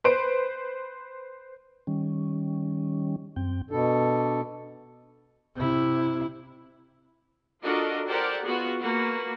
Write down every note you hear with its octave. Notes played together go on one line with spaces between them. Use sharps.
B4 C5 D7
D#3 G3 C#4
F#2 C4 G5
B2 D4 A4
C3 E4
D4 F4 F#4 A4 A#4 D#5
G4 A4 A#4 C5 D5 F#5
B3 F4 F#4 G#4
A#3 F#4 B4